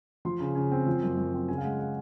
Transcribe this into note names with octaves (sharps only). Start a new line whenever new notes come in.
F3 C6
C#3
C#3
C4
F3
F#2
F#2
C4
C#3 G#5
F5
G#3 F#5
F#5